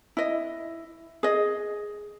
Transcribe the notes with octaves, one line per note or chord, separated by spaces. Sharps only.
E4 D#5
G#4 D#5